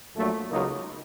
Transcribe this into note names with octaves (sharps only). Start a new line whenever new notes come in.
A#1 A#2 F#3 A3
C#2 C#3 F#3 A#3 D#4